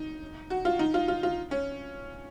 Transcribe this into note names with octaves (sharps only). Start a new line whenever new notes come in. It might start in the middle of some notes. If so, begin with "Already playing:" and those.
Already playing: D#4
F#4
F4
D#4
F4
F4
F4
C#4